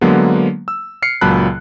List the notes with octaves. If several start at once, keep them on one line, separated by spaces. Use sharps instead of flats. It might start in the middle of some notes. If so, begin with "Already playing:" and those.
D3 F#3 G#3 A#3 B3
E6
F6 C7 C#7
C#2 A#2 F#3 A5 B5 F#6